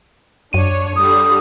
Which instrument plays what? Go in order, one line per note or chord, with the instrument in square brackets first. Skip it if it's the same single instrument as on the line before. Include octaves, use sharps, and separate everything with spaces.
[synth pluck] F#2 D#7 [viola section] D4 C#5
[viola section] D3 G3 [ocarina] D#6